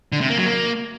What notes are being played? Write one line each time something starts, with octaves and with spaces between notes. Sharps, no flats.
D3
C3
A#3
F#3
A#3